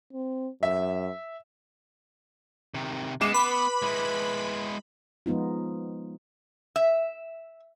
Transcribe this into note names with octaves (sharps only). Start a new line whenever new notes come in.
C4
F#2 E5
C3 D#3
G#3 B3 D6 C7 E7
B4 B5
G#3 E4
F3 G#3 B3 D#4 F4
E5